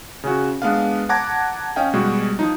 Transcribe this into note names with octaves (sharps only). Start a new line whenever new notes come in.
C#3 C#4 F#4
G#3 B3 D4 B4 F5
F#5 A5 A#5 D6 G#6 A#6
C#4 D#5 F5 G5
B2 G3 G#3 F#4
F3 D#4